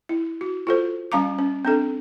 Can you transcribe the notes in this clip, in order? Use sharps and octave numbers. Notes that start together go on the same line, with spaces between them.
E4
F#4
F4 A4 C5
G3 C#4 F5 A#5 D6
C#4
C4 D4 A4